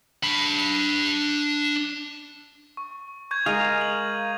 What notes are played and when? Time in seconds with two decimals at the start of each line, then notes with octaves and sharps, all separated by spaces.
0.23 D4 B5
2.77 C#6
3.31 C#6 G6 G#6
3.46 G#3 A#4 F5 D#6 G#6 D#7
3.81 F#7